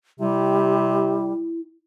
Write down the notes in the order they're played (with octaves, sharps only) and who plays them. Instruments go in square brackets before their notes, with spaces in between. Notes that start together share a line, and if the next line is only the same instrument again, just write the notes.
[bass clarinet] C3 [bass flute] G3 [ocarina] E4